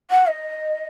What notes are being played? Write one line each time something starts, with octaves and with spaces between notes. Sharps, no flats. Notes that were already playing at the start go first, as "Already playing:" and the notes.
F#5
D#5